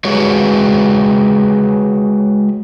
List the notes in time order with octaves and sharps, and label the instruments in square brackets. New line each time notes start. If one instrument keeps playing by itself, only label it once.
[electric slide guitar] G#3 F#4 B4 C#5